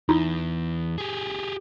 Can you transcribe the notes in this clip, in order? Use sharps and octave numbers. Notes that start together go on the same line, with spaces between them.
E2 D#4 E4
G4 G#4